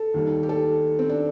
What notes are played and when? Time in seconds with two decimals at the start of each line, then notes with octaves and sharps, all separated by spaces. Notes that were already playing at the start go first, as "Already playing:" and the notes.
Already playing: A4
0.14 D#2 D#3 G3
0.43 G4
0.49 A4
0.99 C4
1.09 D4